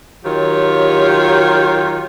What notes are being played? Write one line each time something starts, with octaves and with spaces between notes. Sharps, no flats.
D#3 F#3 F4 G4 C#5